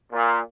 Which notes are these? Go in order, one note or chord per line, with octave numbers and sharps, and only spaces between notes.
A#2